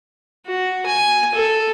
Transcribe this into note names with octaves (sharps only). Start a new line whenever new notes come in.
F#4
G#5
A4